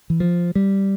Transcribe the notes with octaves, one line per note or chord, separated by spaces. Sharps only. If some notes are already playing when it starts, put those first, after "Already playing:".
E3
F3
G3